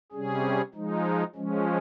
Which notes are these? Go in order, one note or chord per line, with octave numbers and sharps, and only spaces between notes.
C3 G3 C#4 G#4
F3 G#3 D#4
F3 G#3 C#4